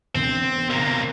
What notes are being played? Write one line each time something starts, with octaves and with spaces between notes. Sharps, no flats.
E1 D3 B3 C4
C3 A#3